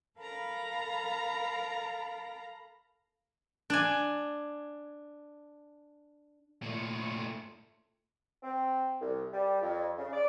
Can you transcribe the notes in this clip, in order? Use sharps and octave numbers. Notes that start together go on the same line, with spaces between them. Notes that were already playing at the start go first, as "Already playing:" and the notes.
A4 A#4 F5 A#5 B5
D4 G#5
A#2 A3
C4
C2
G3
F2
C#3
D5